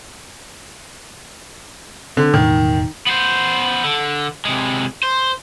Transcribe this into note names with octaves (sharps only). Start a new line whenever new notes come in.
D3 C4
E1 A2 D#3
B3 C5
D3
C3 G#3
C5